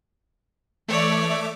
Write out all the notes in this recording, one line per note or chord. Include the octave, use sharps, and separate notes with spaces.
E3 A3 C#5 D5 E5 D6